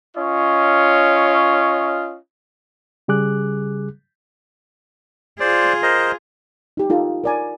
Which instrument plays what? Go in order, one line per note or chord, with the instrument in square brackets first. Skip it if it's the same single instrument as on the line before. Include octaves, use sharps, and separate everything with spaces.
[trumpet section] C#4 F4 C#5 D#5
[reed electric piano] C#3 G3 G#4 D6 F#6
[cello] F4 G#4 [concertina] C5 D5
[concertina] A#4 C5 D#5
[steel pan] D#4 G4
D#4 F4 A4
A#4 D5 G#5